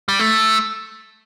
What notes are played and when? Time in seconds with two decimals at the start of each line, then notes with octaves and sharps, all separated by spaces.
0.09 G3
0.19 A3